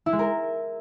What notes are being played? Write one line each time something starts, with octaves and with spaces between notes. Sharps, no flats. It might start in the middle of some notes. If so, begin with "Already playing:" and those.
E4
G#3
A#4